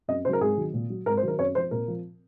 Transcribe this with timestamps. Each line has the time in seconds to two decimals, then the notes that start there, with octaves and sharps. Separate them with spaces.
0.08 F#2 D#5
0.25 C#3 C5
0.29 F#3 A#4
0.41 G#2 G#4
0.57 D#3 F#3
0.73 A#2
0.90 F#3
1.06 G#2 A#4
1.17 C5
1.23 D#3 F#3 A#4
1.39 F#2 C#5
1.55 F3 C5
1.71 A#2 A#4
1.88 F3